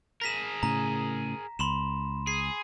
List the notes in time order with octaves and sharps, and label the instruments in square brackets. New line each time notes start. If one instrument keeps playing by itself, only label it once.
[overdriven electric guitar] G#4 A#4 [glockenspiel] A#6 B6 E7
[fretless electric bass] A2 C#3 [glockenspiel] A#5
[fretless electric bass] C#2 [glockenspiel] B5 C6 E7
[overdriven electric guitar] G#4 [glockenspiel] C7